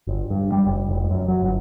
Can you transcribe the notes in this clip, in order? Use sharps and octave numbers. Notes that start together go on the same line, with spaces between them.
G1
G2
G3
F#1
F1
F#2
F#3
G1